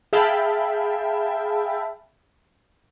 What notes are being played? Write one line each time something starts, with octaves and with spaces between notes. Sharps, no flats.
G#4 E5 F5 G5 A5 B5